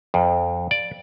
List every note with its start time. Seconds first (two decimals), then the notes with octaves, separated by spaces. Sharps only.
0.14 F2
0.71 D5